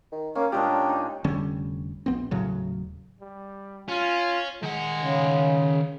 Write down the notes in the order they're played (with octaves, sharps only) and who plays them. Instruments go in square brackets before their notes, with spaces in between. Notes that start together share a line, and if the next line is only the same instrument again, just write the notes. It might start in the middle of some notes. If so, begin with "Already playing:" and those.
[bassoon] D#3
[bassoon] A#3 [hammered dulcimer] C#4
[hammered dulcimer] A#2 G#3 D4 [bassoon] G4
[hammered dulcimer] D#4
[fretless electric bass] F1 D3 G3 C#4
A#1 B3 C4
D#1 A2 C#3 F#3
[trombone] G3
[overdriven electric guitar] C#4 [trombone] F4
[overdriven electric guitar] D#3 F#5 [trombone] G#3
[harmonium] C#3